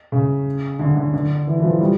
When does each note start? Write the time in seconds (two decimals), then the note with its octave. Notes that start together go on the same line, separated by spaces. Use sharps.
0.12 C#3
0.79 D3
0.96 D3
1.14 D3
1.47 E3
1.60 E3
1.64 F3
1.81 G3